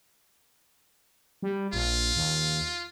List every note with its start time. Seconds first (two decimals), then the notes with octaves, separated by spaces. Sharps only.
1.42 G3
1.73 A#1 F4
2.16 D#2